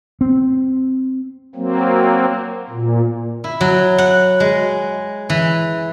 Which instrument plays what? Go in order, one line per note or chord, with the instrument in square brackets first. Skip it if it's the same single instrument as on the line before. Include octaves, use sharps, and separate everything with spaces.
[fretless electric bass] C4
[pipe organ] F#3 A#3 C4
A#2
[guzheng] E4
F#3
F#5
G#3
E3